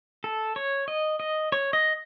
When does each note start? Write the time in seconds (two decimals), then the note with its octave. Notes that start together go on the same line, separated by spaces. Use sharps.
0.24 A4
0.56 C#5
0.88 D#5
1.20 D#5
1.52 C#5
1.73 D#5